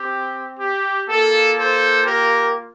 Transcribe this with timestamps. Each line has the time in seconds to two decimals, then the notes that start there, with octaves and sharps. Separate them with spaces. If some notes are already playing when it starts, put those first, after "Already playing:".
Already playing: C4 G4
0.58 G4
1.08 A#3 F4 A4
1.56 A4 C5
2.05 G4 A#4